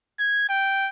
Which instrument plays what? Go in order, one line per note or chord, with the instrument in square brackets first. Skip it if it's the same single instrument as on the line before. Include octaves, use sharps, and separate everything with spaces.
[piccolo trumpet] G#6
G5